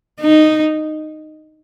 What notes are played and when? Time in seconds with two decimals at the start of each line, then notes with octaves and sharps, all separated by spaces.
0.21 D#4